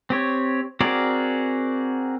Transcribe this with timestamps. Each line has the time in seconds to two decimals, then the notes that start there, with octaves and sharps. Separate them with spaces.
0.10 C4 G4 C#5
0.81 C4 F#4 G#4 A#4 D5